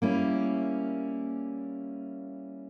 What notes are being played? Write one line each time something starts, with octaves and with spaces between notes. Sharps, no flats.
G3 A#3 C#4 E4